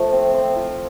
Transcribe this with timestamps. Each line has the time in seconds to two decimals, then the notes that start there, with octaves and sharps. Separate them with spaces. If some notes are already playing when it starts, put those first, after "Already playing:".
Already playing: F3 A3
0.12 C4
0.34 C4
0.56 F4